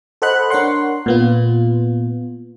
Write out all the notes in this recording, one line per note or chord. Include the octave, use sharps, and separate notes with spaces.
A4 C5 D#5 F#5 B5 F#6
D4 A#4 C#5 F#5 C6
A#2 B3 F4